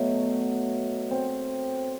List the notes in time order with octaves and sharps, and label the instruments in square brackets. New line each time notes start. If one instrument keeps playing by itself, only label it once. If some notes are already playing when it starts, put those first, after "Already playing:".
Already playing: [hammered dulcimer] B2 F#3 A3
C4